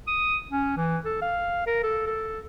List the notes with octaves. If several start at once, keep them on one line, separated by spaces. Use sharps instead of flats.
D#6
C#4
E3
A4
F5
A#4
A4
A4